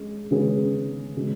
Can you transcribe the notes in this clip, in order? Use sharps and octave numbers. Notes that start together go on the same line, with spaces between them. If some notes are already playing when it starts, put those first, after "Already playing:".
Already playing: G#3 C#4
C#3 G#3 C#4 G#4 B4
C#3 G#3 C#4